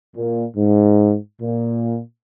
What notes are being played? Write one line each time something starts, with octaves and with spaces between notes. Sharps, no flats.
A#2
G#2
A#2